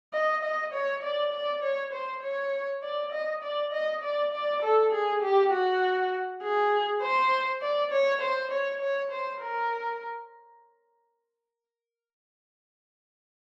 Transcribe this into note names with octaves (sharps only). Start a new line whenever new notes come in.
D#5
D#5
C#5
D5
D5
C#5
C5
C#5
D5
D#5
D5
D#5
D5
D5
A4
G#4
G4
F#4
G#4
C5
D5
C#5
C5
C#5
C#5
C5
A#4